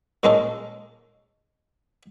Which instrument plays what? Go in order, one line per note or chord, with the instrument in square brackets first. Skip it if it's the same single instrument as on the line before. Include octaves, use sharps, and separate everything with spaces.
[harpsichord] A#2 G#3 A#3 C#4 D#4 A4